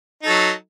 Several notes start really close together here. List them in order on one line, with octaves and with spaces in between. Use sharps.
D#4 A4 F#3